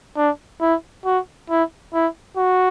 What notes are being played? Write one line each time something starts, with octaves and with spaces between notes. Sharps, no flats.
D4
E4
F#4
E4
E4
F#4